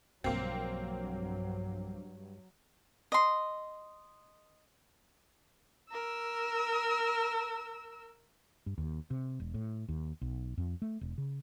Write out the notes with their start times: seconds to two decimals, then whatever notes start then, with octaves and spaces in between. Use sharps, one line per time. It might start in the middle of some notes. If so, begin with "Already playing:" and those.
0.24 B1 G2 F3 F#3 A#3 C4
3.12 D#5 C6
5.92 A#4 E6
8.66 G2
8.78 D#2
9.10 C3
9.40 E1
9.54 A2
9.89 D#2
10.21 B1
10.58 F2
10.82 A3
11.01 E1
11.18 C#3